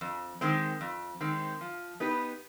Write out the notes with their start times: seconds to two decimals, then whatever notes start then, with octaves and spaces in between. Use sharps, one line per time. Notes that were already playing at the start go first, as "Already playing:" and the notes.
0.01 F2
0.41 D#3 G#3 C4
0.81 F2
1.21 D#3 G#3 C4
1.61 F3
2.00 B3 D#4 G4 B4